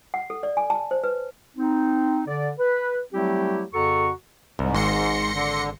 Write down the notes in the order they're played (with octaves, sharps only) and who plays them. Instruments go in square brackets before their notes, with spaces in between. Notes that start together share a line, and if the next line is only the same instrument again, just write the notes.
[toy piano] F#5
A4
D5
G#5
A5
C5
B4
[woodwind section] C4 D#4
D3 D5
B4
F#3 G3 A3 C4 E4 G4
F2 C#3 F#4 A4 A#5 C#6
[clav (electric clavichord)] C2 [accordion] G#2
[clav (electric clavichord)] G#1 [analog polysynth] C6 A#6 C#7
[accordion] D3